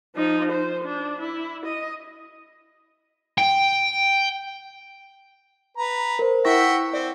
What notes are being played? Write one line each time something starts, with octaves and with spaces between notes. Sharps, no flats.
F3 D#4
C5
D4
E4
D#5
G5
B4 A#5
A#4 C5
E4 E5 F#5 G5 C#6 A#6
C4 D5